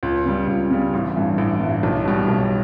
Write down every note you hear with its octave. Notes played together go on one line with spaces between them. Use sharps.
C#2
C#3 G3
C#2
C#3 G3
A1
G2 E3
A1
G2 E3
B1
B2 G3
B1